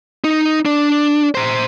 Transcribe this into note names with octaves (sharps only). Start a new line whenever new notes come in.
D#4
D4
C5 A#5